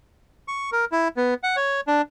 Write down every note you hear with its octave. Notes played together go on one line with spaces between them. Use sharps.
C#6
A#4
E4
B3
F#5
C#5
D4